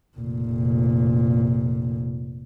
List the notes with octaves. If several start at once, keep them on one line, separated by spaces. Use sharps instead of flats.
F1 A#2